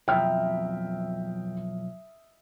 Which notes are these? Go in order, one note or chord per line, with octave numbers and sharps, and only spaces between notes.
B1 F2 D#5 E5 G5 F6